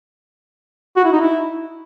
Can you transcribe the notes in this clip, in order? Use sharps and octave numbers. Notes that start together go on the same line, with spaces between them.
F#4
E4
D#4
E4